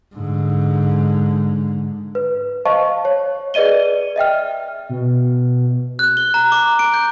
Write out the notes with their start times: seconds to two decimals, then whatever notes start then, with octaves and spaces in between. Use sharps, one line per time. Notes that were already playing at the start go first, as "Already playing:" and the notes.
0.15 G#2 D3
2.15 B4
2.65 C5 D#5 F5 A5 C#6
3.05 C#5
3.54 G#4 B4 D5 D#5 D#7 G7
4.16 D#5 E5 G5 F6
4.89 B2
5.99 F#6
6.17 G7
6.34 A#5
6.52 D6
6.79 D7
6.94 G6